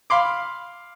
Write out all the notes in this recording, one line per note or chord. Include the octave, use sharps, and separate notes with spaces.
F5 B5 C6 D6